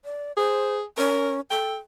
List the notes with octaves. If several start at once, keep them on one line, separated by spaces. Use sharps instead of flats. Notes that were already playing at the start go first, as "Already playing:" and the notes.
D5
G#4 C5
C#4 A#4
A4 G5